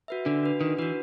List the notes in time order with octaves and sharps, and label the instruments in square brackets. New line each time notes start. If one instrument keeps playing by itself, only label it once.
[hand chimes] F#4 B4 E5
[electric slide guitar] D3 [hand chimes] D4
[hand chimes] F#4 B4
[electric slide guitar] D#3 [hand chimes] D4
[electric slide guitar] E3 [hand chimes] F#4 B4